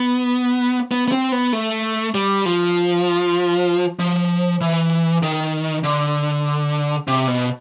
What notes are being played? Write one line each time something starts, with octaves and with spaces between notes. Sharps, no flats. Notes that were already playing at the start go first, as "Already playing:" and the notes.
Already playing: B3
B3
B3
C4
B3
A3
G3
F3
F3
E3
D#3
D3
C3
B2